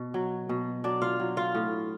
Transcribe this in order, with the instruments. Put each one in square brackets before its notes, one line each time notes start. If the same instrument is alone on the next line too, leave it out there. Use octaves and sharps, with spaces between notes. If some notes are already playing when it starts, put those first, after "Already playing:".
Already playing: [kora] B2
F#3
B2
F#3 D4 D5
F4 F5
F#3
F4 F5
A2